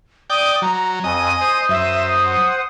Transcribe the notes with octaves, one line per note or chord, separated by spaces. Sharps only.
D5 G5 D#6
F#3 A#5
F2 D#5 G#5
C5 D#6
F#2 E5
F#5